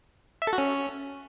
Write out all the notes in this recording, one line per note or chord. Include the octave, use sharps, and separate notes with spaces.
E5
A4
F#4
C#4